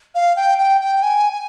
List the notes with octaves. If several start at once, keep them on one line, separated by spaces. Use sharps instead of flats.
F5
G5
G5
G5
G#5
G#5